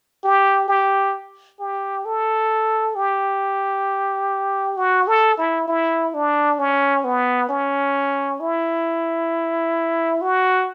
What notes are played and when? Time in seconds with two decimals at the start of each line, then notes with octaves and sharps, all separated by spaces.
0.24 G4
0.68 G4
1.60 G4
2.05 A4
2.96 G4
4.77 F#4
5.08 A4
5.38 E4
5.68 E4
6.14 D4
6.59 C#4
7.04 B3
7.49 C#4
8.40 E4
10.21 F#4